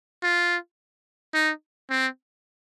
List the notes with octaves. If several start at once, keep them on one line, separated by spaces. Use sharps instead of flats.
F4
D#4
C4